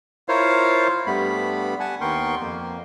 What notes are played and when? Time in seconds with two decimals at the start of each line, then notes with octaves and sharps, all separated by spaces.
0.29 E4 F4 A#4 C5 C#5 F5
1.07 G2 G3 A3 B3 B5
1.80 F#5 G#5 A5
2.01 D#2 B3 A#4 G5 C6 C#6
2.40 F2 A#3